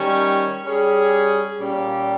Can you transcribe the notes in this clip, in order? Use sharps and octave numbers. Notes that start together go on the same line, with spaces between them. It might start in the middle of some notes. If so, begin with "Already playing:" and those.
Already playing: D#3 G3 C#4
G3 C#4 G#4
A#2 G3 C#4 G4